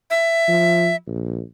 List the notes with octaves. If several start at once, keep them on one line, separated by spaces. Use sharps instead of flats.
E5
F3
A#1